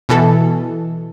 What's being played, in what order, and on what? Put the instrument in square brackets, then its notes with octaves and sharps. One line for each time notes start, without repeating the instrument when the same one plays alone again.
[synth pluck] B2 E3 A4